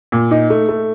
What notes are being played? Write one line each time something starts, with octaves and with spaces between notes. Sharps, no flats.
A#2
D#4
A3
A3